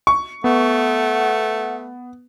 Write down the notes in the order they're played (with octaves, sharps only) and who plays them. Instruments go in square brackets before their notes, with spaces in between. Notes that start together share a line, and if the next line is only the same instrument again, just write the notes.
[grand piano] C#6
[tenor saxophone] A3 [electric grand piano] B3 [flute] F#5